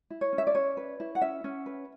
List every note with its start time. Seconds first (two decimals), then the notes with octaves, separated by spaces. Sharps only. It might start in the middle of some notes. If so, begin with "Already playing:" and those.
0.10 E4
0.21 C#5
0.33 C#4
0.38 E5
0.47 D5
0.55 C#4 C#5
0.77 B4
1.00 E4
1.15 F#5
1.21 C#4 E5
1.44 C#4
1.66 B4